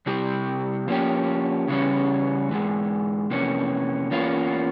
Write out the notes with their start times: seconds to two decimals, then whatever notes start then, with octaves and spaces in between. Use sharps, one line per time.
0.06 C3 G3 C4 E4 G4
0.88 F3 A#3 C#4 G4
1.68 C#3 E3 G3 C#4
2.49 G#2 E3 G#3
3.30 F2 C3 E3 A#3 C#4
4.11 E2 E3 A#3 C#4 F4